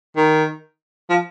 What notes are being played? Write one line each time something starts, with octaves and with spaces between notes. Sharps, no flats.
D#3
F3